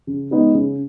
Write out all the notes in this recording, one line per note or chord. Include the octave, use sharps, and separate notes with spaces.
C#3
G#3 B3 D#4
C#3